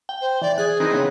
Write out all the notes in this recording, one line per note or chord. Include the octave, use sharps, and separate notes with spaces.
G5
C5
E3 D5
G#4 F#6
E3 C4 D#4
C#3 B3